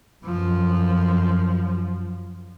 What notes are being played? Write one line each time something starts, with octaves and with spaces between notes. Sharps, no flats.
F#2 F3